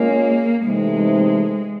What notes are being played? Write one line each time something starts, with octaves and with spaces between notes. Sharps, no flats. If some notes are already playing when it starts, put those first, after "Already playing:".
Already playing: G#3 A#3 C#4 F4 A#4 C#5
C3 E3 G#3 A3 C4 D#4